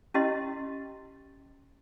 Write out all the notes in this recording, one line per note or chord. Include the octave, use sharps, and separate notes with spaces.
C#4 E4 G4 D#5 C6